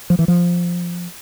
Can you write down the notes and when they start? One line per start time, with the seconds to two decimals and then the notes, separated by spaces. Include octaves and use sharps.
0.10 F3
0.19 E3
0.28 F3